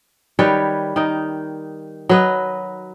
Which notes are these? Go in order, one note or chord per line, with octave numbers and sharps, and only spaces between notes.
D#3 G3 B4 C#5
D#3 D#4
F#3 B4 D#5